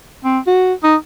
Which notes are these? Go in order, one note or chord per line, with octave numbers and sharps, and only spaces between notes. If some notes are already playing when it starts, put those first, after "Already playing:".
C4
F#4
D#4